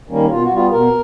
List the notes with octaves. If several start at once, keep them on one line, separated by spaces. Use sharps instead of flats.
D#3 G3 A#3 C#4
B2 F4
F#4
G3 B3 F4
B2 A#4